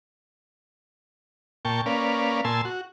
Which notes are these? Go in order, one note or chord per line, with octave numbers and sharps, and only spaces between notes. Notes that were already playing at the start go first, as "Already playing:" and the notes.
A#2 G5 A5 C#6
A#3 C#4 B4 D5 F5
A#2 G#5 A5 C6 E6
F#4